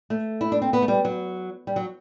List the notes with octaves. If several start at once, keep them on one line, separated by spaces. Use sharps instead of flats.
A3
E4
D4
C4
B3
A3
G3
F#3
G3
F#3